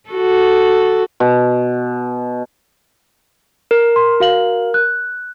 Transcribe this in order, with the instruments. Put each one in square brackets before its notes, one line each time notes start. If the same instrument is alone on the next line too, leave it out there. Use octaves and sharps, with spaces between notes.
[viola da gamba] F#4 A4
[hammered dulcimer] B2
[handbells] A#4
[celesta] C6
F#4 F5 F#7
F#6